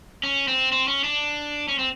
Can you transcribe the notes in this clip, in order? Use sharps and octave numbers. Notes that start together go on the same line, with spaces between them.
C#4
C4
C4
C#4
D4
C#4
C4